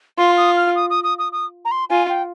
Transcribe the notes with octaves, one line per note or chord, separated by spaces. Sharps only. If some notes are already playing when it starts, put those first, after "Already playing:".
F4 C6
D#6
F6
D#6
D#6
D#6
D#6
D#6
A#5
C6
F4 G#5
G5